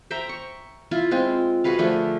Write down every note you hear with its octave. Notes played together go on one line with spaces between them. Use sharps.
C5 E5 G5 A#5
C#6
E4 F4
G#3 C4 F4
F#4 G#4 B4 F5
D3 F3 A3 G#4